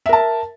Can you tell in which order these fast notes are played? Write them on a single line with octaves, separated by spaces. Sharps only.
E5 A#4 A5